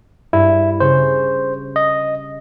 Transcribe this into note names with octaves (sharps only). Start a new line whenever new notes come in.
G2 E4
C#3 C5 C#6
D#5